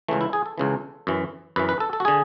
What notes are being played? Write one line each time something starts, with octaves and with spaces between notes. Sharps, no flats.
C#2 C#3 E3 A3
E4
G#4
A4
C#2 C#3 E3
F#2 E3
F#2 E3 B4
B4
A4
A4
F#4
D3 G#4